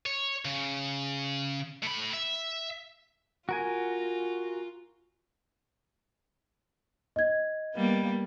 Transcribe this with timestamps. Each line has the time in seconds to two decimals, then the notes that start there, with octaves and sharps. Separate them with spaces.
0.06 C#5
0.45 C#3
1.83 A2 B5
2.14 E5
3.49 F4 F#4 A#4 G#5
7.16 D#5 G#6
7.75 G3 A#3 B3